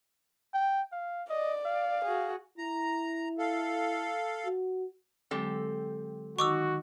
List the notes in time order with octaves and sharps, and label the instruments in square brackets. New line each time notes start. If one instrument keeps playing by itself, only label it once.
[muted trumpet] G5
F5
[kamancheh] D5 [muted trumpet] D#5
[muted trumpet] F5
[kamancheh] F#4 G#4
[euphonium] E4 [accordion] A#5
[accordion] A4 F5
[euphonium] F#4
[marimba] D3 F#3 G#3 [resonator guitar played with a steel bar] C4 G4 A4
[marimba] D#3 D#4 [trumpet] F#4 [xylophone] C#6 D6 E6